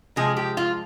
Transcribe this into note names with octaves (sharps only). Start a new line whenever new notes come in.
C3 F3 G#3 G#4
G4
F4